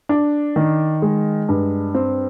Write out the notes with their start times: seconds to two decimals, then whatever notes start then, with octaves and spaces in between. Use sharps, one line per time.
0.09 D4
0.56 D#3
1.02 G#3
1.49 G2
1.95 C4